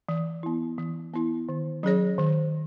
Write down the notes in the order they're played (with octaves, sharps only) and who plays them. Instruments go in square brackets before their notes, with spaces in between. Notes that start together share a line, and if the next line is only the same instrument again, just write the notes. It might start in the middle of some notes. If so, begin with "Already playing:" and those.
[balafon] E3
B3 E4
E3
B3 E4
D#3
F#3 C#4 G#4 C#5
D#3